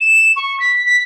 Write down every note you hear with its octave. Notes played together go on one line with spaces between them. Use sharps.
E7
C#6
B6
B6